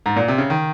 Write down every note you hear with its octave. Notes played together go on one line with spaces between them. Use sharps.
G#2
A#2
C3
C#3
D#3